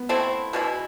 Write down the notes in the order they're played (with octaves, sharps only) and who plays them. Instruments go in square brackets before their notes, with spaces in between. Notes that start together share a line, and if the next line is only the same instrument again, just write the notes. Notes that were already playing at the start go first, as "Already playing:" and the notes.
Already playing: [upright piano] B3
[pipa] A3 C4 E4
B2 G#3 C#4 E4